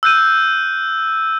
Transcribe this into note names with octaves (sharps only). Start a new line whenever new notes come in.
E6 F#6 G6 D#7